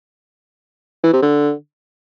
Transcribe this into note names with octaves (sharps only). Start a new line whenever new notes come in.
E3
C3
D3